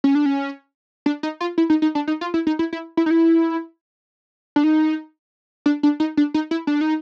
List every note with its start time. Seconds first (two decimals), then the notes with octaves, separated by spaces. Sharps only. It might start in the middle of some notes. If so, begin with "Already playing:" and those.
0.04 C#4
0.15 D4
0.26 C#4
1.06 D4
1.23 D#4
1.40 F4
1.58 E4
1.70 D#4
1.82 D#4
1.95 D4
2.07 D#4
2.21 F4
2.34 E4
2.47 D#4
2.59 E4
2.73 E4
2.97 E4
3.06 D#4
3.11 E4
4.56 D4
4.64 D#4
5.66 D4
5.83 D4
6.00 D#4
6.17 D4
6.34 D#4
6.51 E4
6.67 D4
6.81 D#4